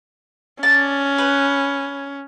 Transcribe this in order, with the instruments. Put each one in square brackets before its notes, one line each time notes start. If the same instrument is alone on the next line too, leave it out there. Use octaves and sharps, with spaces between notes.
[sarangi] C#4 [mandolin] D5 A5
[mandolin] B4